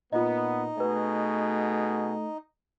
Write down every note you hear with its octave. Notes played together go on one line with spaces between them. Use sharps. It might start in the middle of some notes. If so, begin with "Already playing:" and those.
A#2 B3 D#4 F4 D#5
B2 A3 F#4 G#4 B4 D#5